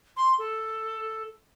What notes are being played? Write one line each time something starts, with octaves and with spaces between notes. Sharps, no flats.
C6
A4